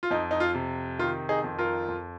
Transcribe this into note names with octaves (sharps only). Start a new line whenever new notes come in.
F4
F2 D#4
D#4
F4
C3
D#3 F4
D#4 G#4
F2
F4 A#4
F2